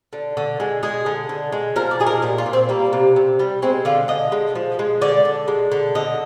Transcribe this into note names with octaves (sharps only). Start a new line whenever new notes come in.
D3
D3
G#3
G#3 G#4
D3
D3
G#3
F3 A#4
D5
G#3 G#4
A#4
A#2 G4
F4
A#2
C4
G3 A#3
C3
C3
G3
G#3 C4
D3 F4
D3 D#5
G#3
F3
G#3
D3 D5
D3
G#3
D3
D3 D#5